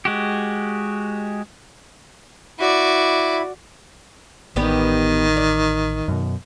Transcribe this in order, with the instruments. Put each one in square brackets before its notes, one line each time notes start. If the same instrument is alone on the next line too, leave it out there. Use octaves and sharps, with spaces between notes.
[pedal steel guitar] G#3 F#4 G4
[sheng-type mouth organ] E4 B5 [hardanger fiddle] F#4 D5
[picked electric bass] A1 [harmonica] D#3 [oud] B3 G4 D5
[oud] D5
[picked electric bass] F#2 B2